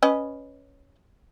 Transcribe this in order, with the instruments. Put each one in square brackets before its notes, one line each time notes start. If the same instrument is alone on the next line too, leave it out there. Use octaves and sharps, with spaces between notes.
[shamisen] C#4 B4 D#5